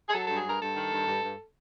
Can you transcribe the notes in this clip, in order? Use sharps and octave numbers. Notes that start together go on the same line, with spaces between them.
G#4
F#3 A4
G2 A4
G#4
G2 A#4
G2 A4
D#3
G2
G2
G2